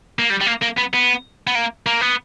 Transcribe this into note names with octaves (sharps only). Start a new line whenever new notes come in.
A#3
G3
G3
A#3
A#3
B3
B3
B3
A#3
A#3
B3